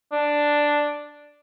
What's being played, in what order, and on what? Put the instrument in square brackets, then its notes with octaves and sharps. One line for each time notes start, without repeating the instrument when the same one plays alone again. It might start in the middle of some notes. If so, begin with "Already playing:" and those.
[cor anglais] D4